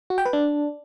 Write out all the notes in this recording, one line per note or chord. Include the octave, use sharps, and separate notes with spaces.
F#4
G5
B4
D4